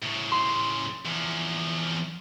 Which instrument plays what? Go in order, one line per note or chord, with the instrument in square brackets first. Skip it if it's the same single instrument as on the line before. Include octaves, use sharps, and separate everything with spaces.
[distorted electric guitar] A2 C#3
[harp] C6
[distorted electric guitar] E2 F3